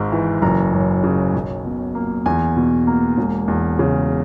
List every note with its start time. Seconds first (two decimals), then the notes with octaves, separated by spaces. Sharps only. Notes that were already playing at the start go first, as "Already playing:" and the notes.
Already playing: G#1 G#2
0.12 E3
0.42 F#1 A#5
0.73 F#2
1.04 C#3
1.34 B1
1.65 B2
1.95 A#3
2.26 E2 G#5
2.56 B2
2.87 A#3
3.18 E1
3.48 E2
3.79 C#3